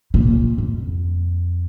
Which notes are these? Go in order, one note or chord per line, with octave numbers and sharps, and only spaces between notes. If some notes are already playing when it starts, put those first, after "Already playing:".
A#2
F2